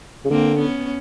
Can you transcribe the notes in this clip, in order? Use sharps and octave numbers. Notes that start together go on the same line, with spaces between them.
C#3
D3 A#3 C4
B3 C#4